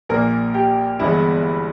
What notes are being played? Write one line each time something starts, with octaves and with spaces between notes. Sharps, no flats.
A#1 A#2 A#3 A#4
G4
G1 G2 E3 G#3 B3 E4